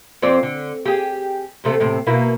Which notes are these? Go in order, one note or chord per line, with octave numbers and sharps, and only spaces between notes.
F2 C4 D5
D3
G4 G#4
E2 C3 A3
E2 A2 C3
B2 A#3 E4